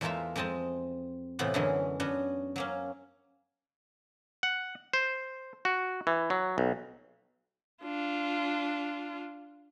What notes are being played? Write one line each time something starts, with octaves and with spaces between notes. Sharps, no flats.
E2 G#3 A3 F4 A#4 E5
F2 G#3 C4 D#5 A5
A2 C3 E3 B3 F4
F#2 D3 E3 F#3 G#3 C#4
B3 C#4 D4 F#4
F#3 A#3 C#4
F#5
C5
F#4
E3
F#3
B1
D4 F4